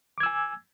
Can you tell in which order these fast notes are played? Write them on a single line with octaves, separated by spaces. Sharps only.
D6 G#6 E6 G#5